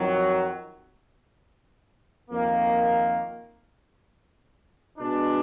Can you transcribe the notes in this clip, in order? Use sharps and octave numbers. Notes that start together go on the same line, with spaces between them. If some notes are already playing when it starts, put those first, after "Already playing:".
Already playing: F2 D#3 F#3
F2 D#3 A#3
B2 G#3 D4